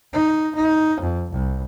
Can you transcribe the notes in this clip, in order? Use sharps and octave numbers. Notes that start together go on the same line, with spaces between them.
D#4
D#4
F2
C2